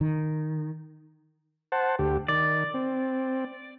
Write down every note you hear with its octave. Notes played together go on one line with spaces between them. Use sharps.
D#3
C5 F#5 A5
D2 G4
D#3 D5
C4